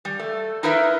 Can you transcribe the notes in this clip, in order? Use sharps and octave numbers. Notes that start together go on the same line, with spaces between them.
G3
A3
D#4 E4 A#4 B4 E5